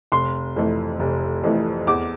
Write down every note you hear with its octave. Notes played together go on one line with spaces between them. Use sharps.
F1 C6
F2 E3 A3
F1
F2 E3 A3
E2 D6